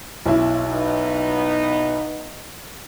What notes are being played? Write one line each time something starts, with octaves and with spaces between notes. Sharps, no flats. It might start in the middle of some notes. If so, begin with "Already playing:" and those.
B1 E4
B3 D#4